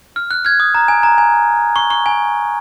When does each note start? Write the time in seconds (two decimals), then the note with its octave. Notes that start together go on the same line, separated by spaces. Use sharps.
0.16 F6
0.31 F#6
0.45 F6 G#6
0.60 D#6
0.75 A#5
0.88 G#5
1.03 A#5
1.18 G#5
1.76 C#6
1.90 C#6
2.06 G#5